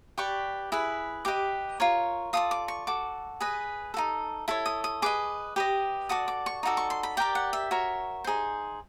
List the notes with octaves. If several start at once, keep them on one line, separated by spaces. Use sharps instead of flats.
G4 B4 D5 C#6
E4 G#4 B4
G4 B4 D#5 D6
F4 A#4 C#5
F4 A4 D5 D#6
D6
C#6
F#4 A4 D6
G#4 B4 D#5
D#4 F#4 A4
E4 A4 C#5
D#6
D#6
G#4 B4 D#5 D6
G4 B4 D#5
F#4 A4 D5 D#6
D6
C#6
D#4 F#4 A4 D5
C#6
C6
B5
G4 A#4 D5 G5
F#5
E5
F#4 A#4 C#5
D#4 G#4 C5